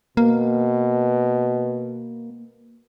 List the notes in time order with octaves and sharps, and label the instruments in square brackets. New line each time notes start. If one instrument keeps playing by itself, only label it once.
[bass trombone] B2 [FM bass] A#3